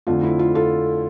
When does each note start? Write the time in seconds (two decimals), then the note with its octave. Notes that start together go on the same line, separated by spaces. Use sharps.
0.07 F2 D3 F3 A3 F4
0.24 E4
0.39 F4
0.55 F4 A4